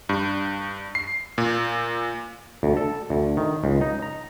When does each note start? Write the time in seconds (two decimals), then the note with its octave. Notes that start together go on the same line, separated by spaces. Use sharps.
0.09 G2
0.95 C7
1.38 A#2
2.63 D2
2.77 A4
3.10 D2
3.37 D#3
3.64 C#2
3.81 D#4
4.02 A#5